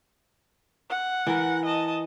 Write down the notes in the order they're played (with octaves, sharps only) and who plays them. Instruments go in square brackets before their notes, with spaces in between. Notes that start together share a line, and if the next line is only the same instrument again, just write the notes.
[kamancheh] F#5
[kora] E3 A#4
[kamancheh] D#5 A5